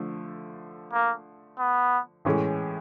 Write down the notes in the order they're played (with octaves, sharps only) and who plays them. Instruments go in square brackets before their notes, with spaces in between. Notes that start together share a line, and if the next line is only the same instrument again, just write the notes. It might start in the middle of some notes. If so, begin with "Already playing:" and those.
Already playing: [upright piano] D3 F3 A3
[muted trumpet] A#3
B3
[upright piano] A2 E3 G#3 C#4